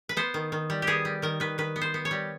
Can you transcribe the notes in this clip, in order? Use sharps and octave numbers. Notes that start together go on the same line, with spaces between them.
B4
B3 C5
D#3
D#3
G3
G4
B3 G#4
G3
D#3 A#4
D#3 B4
D#3 B4
B3
C5
B3
C#5
G3